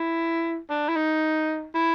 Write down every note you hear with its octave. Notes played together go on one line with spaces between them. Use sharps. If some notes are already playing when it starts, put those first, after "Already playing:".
Already playing: E4
D4
E4
D#4
E4